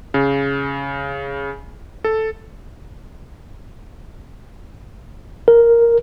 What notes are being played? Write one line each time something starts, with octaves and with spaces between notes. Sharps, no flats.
C#3
A4
A#4